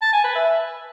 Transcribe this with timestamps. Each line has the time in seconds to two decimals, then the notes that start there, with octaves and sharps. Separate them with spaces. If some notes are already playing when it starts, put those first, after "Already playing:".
0.02 A5
0.13 G#5
0.24 B4
0.35 E5